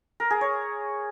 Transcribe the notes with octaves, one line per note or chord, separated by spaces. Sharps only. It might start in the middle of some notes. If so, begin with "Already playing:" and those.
A#4
G#4
C#5